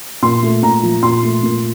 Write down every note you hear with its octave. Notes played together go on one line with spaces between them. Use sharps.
A#2 C6
A3
A#2 A#5
F3
A#2 C6
A3
A#2